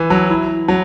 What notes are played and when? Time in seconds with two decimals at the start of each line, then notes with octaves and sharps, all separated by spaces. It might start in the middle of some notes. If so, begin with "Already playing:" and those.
Already playing: E3
0.10 F#3
0.30 E4
0.68 F#3